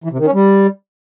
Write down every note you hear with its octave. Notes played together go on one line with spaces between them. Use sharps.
E3
C3
D#3
C#4
G3